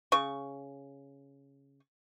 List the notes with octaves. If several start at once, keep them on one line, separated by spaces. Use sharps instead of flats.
C#3 C#6